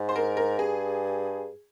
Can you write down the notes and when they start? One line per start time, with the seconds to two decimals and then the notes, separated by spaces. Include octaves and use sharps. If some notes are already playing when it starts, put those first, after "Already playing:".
Already playing: G#2
0.09 C5
0.16 A#4
0.37 A#4
0.59 G2 G#4